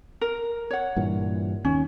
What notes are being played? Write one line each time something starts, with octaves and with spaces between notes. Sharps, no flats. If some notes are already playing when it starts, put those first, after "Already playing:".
A#4
C#5 F#5
G2 A#2 E3
D#2 C#4